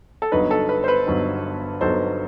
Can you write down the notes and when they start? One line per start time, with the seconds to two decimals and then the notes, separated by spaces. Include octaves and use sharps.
0.22 A4
0.32 G1 G2 F#3 B3 D#4 B4
0.51 A4
0.69 B4
0.84 C5
0.88 B4
1.06 G1 G2 F#3 B3 D#4
1.81 G1 G2 F#3 B3 D#4 A4 C5